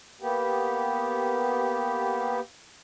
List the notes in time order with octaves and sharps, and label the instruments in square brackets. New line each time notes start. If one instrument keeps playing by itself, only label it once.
[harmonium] A#3 B3 G4